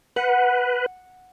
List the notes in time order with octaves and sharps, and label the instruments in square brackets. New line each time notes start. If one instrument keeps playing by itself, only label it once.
[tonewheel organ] B4 [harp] F#5